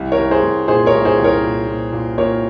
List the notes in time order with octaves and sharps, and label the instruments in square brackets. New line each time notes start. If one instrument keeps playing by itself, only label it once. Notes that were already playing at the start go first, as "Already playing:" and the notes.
Already playing: [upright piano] C2
A#4 C#5
C2
G#4 C5
C2
A#2 G#4 C5
A#4 C#5
C2
G#4 C5
C2
A#4 C#5
A#2
A#2
A#2
A#2 A#4 C#5